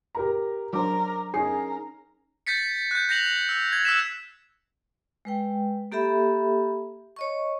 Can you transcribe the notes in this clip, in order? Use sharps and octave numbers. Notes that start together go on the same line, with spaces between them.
G4 A#4 A#5
F#3 D4 A#4 C5 D6
C#4 D#4 G#4 A#4 C7
G6 A6 B6 C#7
F#6 G6
G6 A#6 C7 F7 F#7
E6
G#6
E6 F#6 B6 E7
G#3 B4 G5
A#3 G4 A4 E5 B5
C#5 D#5 C#6